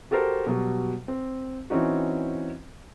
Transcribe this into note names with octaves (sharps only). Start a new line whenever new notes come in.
F#4 G4 A4 A#4 C5
B2 F#3 G3
C4
E3 C4 C#4 D#4 F#4